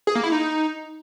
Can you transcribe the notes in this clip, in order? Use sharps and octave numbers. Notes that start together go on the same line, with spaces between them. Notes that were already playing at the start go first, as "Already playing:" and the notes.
G#4
A#3
E4
D#4